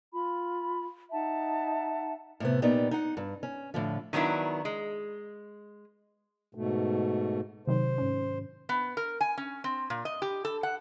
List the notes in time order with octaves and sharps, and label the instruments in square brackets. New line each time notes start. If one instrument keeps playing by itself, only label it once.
[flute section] F4 B5
D#4 E5 F#5 A5
[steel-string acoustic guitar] A2 C3 B3
A#2 B3 D#4 G4 D5
D#4 F#5
G2
C#4
A2 D3 F3
[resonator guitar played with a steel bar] D#3 F#3 B3 D4 E4
G#3
[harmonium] G#2 B2 A3
[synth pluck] C3 D#3 F#3 [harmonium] C5
[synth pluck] G#2 C#4
[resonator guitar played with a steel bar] B3
A#4
G#5
C#4
C4
A#2
D#5
G4
A4
F#5